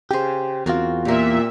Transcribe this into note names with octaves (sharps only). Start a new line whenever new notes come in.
C#3 G4 G#4 C5
E2 C4 F4 F#4 A#4
A#2 G4 A#4 E5